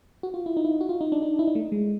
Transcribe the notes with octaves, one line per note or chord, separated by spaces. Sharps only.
F#4
F4
E4
D#4
E4
F#4
F4
D#4
D4
D#4
E4
D#4
A3
G#3